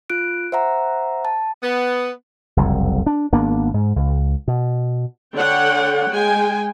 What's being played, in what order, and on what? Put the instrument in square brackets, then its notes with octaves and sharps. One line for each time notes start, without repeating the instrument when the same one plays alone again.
[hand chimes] F4 F#6 D7
C5 E5 F#5 A#5
A5
[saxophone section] B3
[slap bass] F#1 C2 F2
D4
G#1 A#3 B3 D4
G#2
C#2
B2
[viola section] D3 C#5 F#5 G5
G#3 G5 G#5